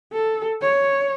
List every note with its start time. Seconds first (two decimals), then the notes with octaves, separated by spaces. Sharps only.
0.13 A4
0.62 C#5